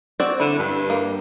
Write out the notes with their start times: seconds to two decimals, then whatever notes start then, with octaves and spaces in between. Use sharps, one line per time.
0.20 C4 F#4 D5
0.40 D3 E4
0.59 G2
0.90 A#3